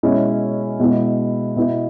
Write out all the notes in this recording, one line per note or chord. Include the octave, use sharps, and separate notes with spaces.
B2 G#3 C#4 E4
B2 G#3 B3 E4
B2 B3 E4